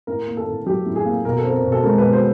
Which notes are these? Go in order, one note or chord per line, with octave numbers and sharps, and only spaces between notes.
A2 A#4
A#3
A4
A2
F#3 G4
A2
G#4
A#3
B2 A#4
A4
C4
A#4
B2
A4
G#3 A#4
B2 B4
C5